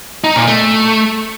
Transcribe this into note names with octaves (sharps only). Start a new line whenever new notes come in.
D#4
A#2
A3